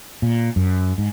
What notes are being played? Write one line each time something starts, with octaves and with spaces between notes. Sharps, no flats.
A#2
F#2
G#2